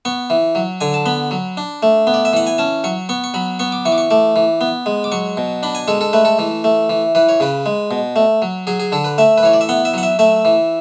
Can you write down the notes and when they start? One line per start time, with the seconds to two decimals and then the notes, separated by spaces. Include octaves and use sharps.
0.05 B3 C#6
0.30 E3
0.55 F#3
0.81 D3 G#5
0.94 A5
1.06 B3 B5
1.31 F#3
1.57 D4
1.83 A3
2.07 B3
2.14 D5
2.25 E5
2.33 E3 F#5
2.47 G#5
2.58 C#4 A5
2.84 F#3 C#6
3.09 B3 C#6
3.24 C#6
3.34 F#3 B5
3.59 B3 C#6
3.72 D6
3.85 E3 C#6
3.92 D6
3.98 C#6
4.11 A3 D6
4.36 E3
4.61 B3
4.86 G#3
5.04 D6
5.12 F#3 C#6
5.37 B2
5.63 D4 B5
5.75 G#5
5.88 G#3 A4
6.01 A4
6.13 A3 B4
6.25 A4
6.39 E3
6.64 A3
6.89 E3
7.15 E3 B4
7.29 C#5
7.40 C#3 B4
7.66 G#3
7.91 B2
8.16 A3
8.42 F#3
8.67 F#3 G#4
8.80 G#4
8.92 D3 A4
9.04 B4
9.18 A3 E5
9.38 B4
9.43 E3 C#5
9.53 D5
9.61 E5
9.69 B3 F#5
9.85 E5
9.94 F#3 F#5
10.03 E5
10.19 A3 E5
10.45 E3